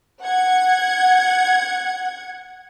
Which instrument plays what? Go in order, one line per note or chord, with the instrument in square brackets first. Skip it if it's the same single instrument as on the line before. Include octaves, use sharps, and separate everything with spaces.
[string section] F#5 G#6